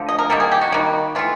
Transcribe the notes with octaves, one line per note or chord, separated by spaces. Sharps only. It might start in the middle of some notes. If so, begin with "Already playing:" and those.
Already playing: D3 F3 A3
D#5
A#4
D#3 G3 A#3 A4
G#4
G4
F#4
D#3 G3 A#3
E3 A3 F4